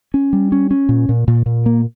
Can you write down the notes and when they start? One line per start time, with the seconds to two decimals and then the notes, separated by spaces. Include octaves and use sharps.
0.14 C#4
0.33 G3
0.52 C#4
0.71 C#4
0.89 A#2
1.09 A#2
1.28 A#2
1.46 A#2
1.66 A#3